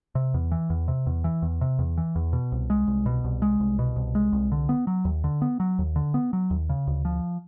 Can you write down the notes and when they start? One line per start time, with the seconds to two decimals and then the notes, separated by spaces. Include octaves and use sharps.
0.15 C3
0.34 E2
0.52 E3
0.70 E2
0.88 C3
1.07 E2
1.24 E3
1.42 E2
1.61 C3
1.79 E2
1.98 E3
2.16 E2
2.33 B2
2.52 C2
2.70 G#3
2.87 C2
3.06 B2
3.24 C2
3.42 G#3
3.60 C2
3.79 B2
3.96 C2
4.15 G#3
4.32 C2
4.52 D3
4.69 B3
4.87 F#3
5.05 D#2
5.24 D3
5.42 B3
5.60 F#3
5.79 D#2
5.96 D3
6.14 B3
6.33 F#3
6.51 D#2
6.69 C#3
6.87 D2
7.05 F3